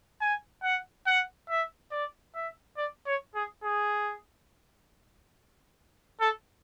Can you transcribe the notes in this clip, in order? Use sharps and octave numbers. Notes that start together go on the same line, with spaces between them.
G#5
F#5
F#5
E5
D5
E5
D5
C#5
G#4
G#4
A4